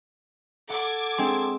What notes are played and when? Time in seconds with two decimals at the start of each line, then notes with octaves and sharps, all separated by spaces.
0.70 A4 F#5 D6 G#6
1.18 G#3 C4 D4 G5 C6